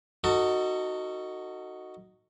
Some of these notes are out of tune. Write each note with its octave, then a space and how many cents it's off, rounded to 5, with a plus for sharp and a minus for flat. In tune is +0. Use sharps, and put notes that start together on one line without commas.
D#4 +0 F#4 +0 A4 +35